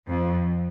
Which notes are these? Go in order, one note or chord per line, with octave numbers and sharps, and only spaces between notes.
F2